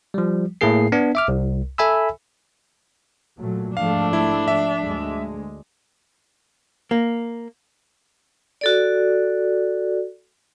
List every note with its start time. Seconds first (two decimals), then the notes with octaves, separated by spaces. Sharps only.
0.14 F3 G3
0.61 A2 A3 A#3 G#4 C7
0.92 B3 D4
1.15 E5 D6 F6
1.28 C2
1.78 A4 E5 G#5 B5 E6
3.38 A#2 F#3 A3
3.77 G#2 F3 A3 D4 F5
4.13 E4
4.48 E5
4.83 D2 G#3
6.91 A#3
8.61 F#4 A4 D5